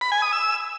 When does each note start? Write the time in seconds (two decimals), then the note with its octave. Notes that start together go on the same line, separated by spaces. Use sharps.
0.01 B5
0.12 G#5
0.22 D#6
0.33 E6